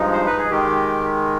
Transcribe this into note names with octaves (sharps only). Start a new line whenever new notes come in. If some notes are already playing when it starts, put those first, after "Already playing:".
Already playing: G2 F3 G#3 D#4
C5
B4
G#4
D#3 G#3 G4